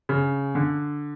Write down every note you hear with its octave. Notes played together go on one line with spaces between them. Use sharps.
C#3
D3